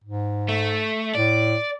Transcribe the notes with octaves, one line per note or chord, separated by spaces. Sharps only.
G#2
A3
A2 D5